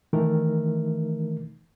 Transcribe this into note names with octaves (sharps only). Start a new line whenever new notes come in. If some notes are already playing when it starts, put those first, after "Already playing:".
D#3 E3 A3 D#4 A#4